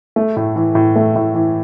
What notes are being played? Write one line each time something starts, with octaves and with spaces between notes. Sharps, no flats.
A3
A2
E3
A2
A3
A2
E3